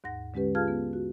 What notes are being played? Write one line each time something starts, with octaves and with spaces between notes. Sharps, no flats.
D#2 G#2 F#5 A#6
D3 G#3 C#4 G4 B4
F4 G#4 F5 A5 F6 G#6
B3
F#4